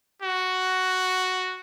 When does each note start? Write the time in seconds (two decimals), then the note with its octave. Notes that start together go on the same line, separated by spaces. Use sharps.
0.22 F#4